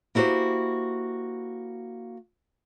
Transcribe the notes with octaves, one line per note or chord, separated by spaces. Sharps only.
A#3 E4 F#4 G4 C5